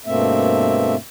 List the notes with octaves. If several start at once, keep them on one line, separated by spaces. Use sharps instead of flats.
G2 B2 A3 A#3 C4 E5